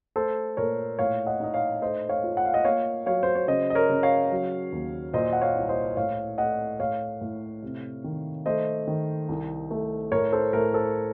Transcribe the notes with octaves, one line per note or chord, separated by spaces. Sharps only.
A3 A4 C5
A#2 A#4 C#5
A2 C#5 F5
D#5 F#5
D#4 D#5
C#5 F5
A3 C5 D#5
C#5 F5
F4
F#5
F5
D#5 F#5
A#3 C#5 F5
F#3 C#5 F5
C5
C#5
C#3 C5 D#5
D#5
A#4 C#5
C#3
C#5 F5
F#3
D#2
A#2 C5 D#5
F#5
C#5 F5
C2
C5 D#5
A2 C#5 F5
A3 D#5 F#5
A2 C#5 F5
A2
C3
D#3
A3 C5 D#5
D#3
C2
A3
A2 A#4 C#5
A4 C5
A2 A#4
A4 C5